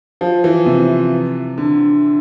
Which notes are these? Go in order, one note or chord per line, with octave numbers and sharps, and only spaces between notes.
F3
E3
C3
D3